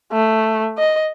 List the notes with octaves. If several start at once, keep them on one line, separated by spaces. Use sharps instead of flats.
A3
D#5